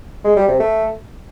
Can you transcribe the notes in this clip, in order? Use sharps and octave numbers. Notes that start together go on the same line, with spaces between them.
G#3
G3
C3
A3